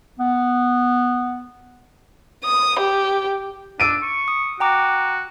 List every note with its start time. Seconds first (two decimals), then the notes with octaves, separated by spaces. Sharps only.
0.19 B3
2.45 D#6
2.80 G4
3.80 D4 E6 D7 D#7
4.03 C#6
4.28 D#6
4.60 F#4 G5 A#5 D6